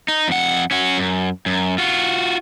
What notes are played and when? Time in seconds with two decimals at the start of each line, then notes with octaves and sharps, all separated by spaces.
0.08 D#4
0.28 F2 F#5
0.71 C#4 F#4
0.98 F#2
1.46 F#2
1.78 F4 F#4